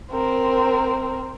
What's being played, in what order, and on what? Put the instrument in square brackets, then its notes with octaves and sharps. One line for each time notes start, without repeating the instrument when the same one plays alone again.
[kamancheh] C4 A#4